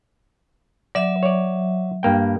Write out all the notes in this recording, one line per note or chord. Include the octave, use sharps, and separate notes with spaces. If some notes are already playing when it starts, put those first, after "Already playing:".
F#3 D5 E5
C#5 D5
G2 A#3 G5